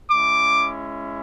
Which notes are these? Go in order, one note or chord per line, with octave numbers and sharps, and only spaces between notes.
G#3 C#4 E4 D6